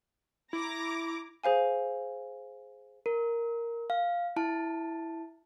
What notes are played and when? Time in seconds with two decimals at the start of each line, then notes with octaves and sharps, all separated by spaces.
0.53 E4 A#5 D6 A#6
1.44 G#4 C5 F5 G#5
3.06 A#4
3.90 F5
4.36 E4 A5